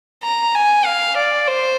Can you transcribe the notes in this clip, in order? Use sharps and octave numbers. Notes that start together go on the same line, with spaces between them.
A#5
G#5
F5
D5
C5